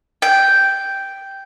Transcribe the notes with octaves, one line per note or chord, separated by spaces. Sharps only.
G5